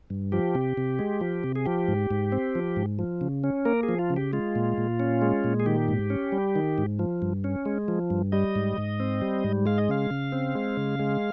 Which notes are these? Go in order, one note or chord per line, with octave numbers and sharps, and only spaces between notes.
G2
F3 G4
C3
C3
G#3
F3
C3
G#4
F3 G4
G#2
G#2
C4
F3
G#2
F3
C#3
C#4
A#3 A#4
G#4
F3
F4
C#3
G4
G#3 F4
A#2
A#2
C#4
G#3
A#2
G#4
D#3 G4
G#2
C#4
G3
D#3
G#2
F3
G2
C#4
G#3
F3
G2
G3 D#5
G#2
G#2
C4
G3
G#2
G#3 F5
D#5
C#3 F5
C#3
C4
G#3
C#3
G#3